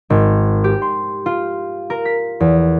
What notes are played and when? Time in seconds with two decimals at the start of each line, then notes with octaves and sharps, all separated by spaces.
0.10 G#1
0.64 G4
0.82 C6
1.26 F4
1.90 A#4
2.05 B6
2.40 E2